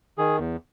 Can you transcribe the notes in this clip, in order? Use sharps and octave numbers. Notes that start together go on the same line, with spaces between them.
D#3 G#4
E2